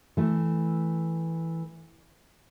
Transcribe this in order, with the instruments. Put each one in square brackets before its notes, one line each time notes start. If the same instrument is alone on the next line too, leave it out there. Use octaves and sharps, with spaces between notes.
[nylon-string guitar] E3 A3